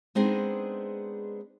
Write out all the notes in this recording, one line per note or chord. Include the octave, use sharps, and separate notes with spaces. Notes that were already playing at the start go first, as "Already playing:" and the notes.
G#3 B3 C4 D4 D#4 G#4